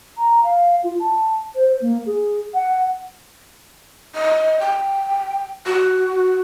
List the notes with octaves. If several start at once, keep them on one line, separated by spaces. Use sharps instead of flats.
A#5
F5
F4
A5
C5
A#3
G#4
F#5
D#5
G5
F#4